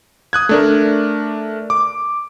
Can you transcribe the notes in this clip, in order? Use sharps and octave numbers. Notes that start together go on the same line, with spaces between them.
D#6 F#6 G#6
A3 D4 A#4
D6